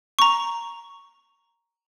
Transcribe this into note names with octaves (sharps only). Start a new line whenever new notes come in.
A#5 C#6